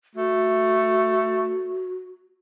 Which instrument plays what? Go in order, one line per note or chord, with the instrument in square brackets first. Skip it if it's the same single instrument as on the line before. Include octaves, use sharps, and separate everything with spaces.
[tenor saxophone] A3 [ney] F#4